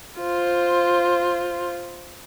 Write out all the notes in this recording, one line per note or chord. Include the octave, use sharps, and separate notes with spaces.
F4 C5